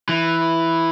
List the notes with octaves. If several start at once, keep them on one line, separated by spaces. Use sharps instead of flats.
E3